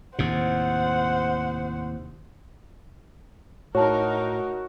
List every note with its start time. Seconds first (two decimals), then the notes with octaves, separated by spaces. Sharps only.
0.19 D#2 A2 C3 C5 F#5
3.75 A2 D#4 F#4 A#4 C#5 A5